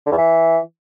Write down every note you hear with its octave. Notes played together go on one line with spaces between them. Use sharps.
D3
E2
E3